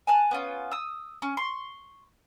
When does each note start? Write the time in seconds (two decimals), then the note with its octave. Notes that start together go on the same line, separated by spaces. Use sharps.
0.07 G#5 A5 F#6
0.31 B3 C#4 F4
0.71 D#6 E6
1.22 C#4
1.37 C6 C#6